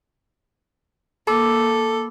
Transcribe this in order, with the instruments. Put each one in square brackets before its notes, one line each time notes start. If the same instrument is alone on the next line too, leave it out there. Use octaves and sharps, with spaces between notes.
[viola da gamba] A#3 [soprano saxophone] A4 [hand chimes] B5 D6 E6